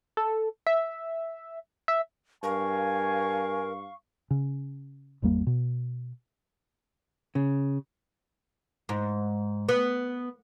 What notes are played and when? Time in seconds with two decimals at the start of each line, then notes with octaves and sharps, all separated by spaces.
0.17 A4
0.67 E5
1.88 E5
2.43 G2 A#4 F5 G#5 C#6
4.31 C#3
5.22 G#1 E2 G3 A#3
5.47 B2
7.35 C#3
8.89 G#2
9.69 B3